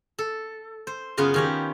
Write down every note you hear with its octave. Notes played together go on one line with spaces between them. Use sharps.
A4
C5
F#2 C#3 B3 F4
D#3 C#4 G4